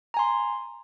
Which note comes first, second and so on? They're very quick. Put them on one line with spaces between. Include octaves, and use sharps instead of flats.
A#5 G#5 C6